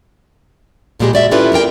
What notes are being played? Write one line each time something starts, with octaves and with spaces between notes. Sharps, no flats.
D#2 A#2 G3 G#3 G4 G#4
F#4 D5 E5
C#4 E4 F4 G4 A4 B4
C4 G4 A#4 G5